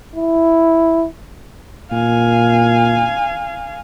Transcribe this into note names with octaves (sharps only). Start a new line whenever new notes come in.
E4
A#2 F5 G#5